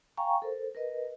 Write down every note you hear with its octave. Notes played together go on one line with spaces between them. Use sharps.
F5 G5 G#5 A#5 C#6
A4 A#4 C5
A#4 B4 D#5